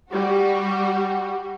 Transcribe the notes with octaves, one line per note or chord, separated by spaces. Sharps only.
G3 F#4